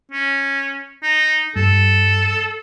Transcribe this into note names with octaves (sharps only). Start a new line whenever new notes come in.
C#4
D#4
G2 A4